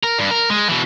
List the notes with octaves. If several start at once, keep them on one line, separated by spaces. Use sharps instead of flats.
A#4
G2
A#4
G#3
B2 E3